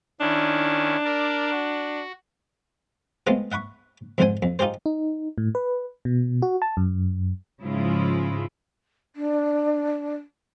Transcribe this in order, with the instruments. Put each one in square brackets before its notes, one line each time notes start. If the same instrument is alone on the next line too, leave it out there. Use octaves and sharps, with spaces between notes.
[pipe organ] D#3 C#4 E4 [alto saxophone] D4
[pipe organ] A#4 D5
F#4
[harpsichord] G#3 A3 B3 C4 F4 G#4
E5 F#5 B5 C#6
F2 G#2 D3 E4 C5 G#5
F2
D#4 F4 G4 G#4 C5
[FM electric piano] D#4
A2
B4
B2
F#4
A5
F#2
[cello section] G#2 C#3 F3 G#3 E4 F4
[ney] D4